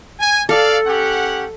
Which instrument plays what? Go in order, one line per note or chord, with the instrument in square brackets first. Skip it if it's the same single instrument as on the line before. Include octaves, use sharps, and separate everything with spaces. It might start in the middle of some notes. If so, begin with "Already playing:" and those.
[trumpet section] G#5
[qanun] A4 [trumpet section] D5 F5
[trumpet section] C#4 G4 F#5